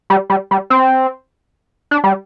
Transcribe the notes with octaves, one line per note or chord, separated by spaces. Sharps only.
G3
G3
G3
C4
D4
G3